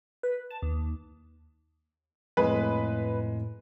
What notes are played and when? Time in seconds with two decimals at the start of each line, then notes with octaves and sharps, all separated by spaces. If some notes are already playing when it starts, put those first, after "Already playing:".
0.23 B4
0.50 A5
0.63 D#2
2.37 F2 A2 G#3 A#3 B4